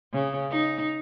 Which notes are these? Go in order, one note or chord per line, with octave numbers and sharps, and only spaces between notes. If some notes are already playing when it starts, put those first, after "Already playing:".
C#3
D#4